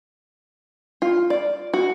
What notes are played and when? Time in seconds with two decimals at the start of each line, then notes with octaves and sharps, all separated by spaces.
1.02 F4
1.30 D5
1.74 F#4